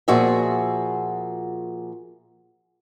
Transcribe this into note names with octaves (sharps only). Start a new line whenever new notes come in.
A#2 F3 F#4 G#4 E5